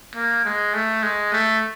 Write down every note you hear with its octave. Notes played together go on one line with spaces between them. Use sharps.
A#3
G#3
A3
G#3
A3